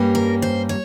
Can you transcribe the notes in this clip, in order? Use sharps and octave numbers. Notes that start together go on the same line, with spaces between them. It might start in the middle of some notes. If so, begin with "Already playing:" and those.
Already playing: G2 G3 A#3 C#4
A#4
C5
C#5